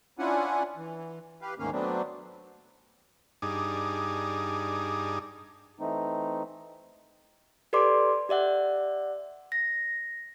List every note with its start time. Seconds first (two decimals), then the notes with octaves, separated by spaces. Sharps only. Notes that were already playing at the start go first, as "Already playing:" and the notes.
0.19 C#4 D4 E4 F4 F#5 G#5
0.77 E3
1.42 G4 B4 F5
1.59 D2 G#2 D#3 A#3 C#4 F5
1.72 F#3 A3 B3 C4 D4
3.42 G2 D4 D#4 G#4
5.80 E3 A3 C4 D#4
7.73 G4 A4 B4 D5 C6 D6
8.29 G4 D5 E5 F#5
9.52 A#6